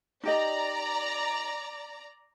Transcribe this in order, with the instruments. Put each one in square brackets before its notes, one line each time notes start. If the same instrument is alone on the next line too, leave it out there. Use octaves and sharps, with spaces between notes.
[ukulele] D#4 G4 D#5 [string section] D5 A#5